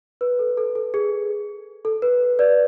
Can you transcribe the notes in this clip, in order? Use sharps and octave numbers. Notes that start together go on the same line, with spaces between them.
B4
A4
A4
A4
G#4
A4
B4
B4 D5